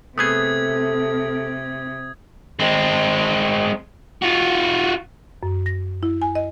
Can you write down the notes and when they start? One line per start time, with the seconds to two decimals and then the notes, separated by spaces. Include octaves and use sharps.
0.18 C3 A3 B3 G#4 A4 D#6 G#6
2.59 G#3 C4
4.22 F4 F#4
5.43 F#2
5.66 A#6
6.03 E4
6.22 G#5
6.35 D#5